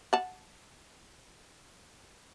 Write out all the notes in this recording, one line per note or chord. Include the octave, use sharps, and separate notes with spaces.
F#5 A5